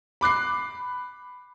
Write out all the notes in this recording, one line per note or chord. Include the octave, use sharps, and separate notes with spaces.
B5 D6 F#6 C7